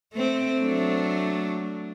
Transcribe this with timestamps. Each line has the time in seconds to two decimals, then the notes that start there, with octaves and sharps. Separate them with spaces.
0.14 A3 C4
0.61 F#3 A3 D4